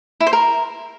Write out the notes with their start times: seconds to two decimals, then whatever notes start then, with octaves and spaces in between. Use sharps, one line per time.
0.20 E4
0.27 C5
0.33 A#4